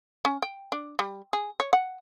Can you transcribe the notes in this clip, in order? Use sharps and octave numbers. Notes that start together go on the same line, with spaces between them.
C#4
G5
D4
G3
G#4
C#5
F#5